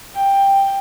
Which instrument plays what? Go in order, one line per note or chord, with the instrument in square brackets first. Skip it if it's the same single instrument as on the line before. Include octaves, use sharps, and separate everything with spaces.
[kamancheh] G5